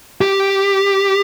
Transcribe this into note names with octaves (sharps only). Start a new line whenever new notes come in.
G4